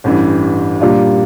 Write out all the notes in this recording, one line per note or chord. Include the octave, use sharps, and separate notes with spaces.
A1 G2 E3
A#2 G3 D4 F4